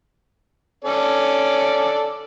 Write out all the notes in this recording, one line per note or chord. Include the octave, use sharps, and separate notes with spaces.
C#4 A4 D5